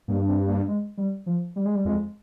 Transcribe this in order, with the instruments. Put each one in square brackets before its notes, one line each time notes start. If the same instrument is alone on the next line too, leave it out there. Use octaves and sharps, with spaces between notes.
[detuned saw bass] G2 [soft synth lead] A#3
[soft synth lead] C4
A#3
G#3
G3
F3
G3
G#3
G3
[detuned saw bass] F2 [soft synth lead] G#3